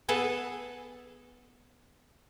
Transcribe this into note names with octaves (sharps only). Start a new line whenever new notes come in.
B3 G#4 A4 B4 A5